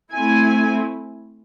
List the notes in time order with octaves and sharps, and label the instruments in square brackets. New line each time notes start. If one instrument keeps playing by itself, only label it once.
[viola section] A3 C4 E4 G#5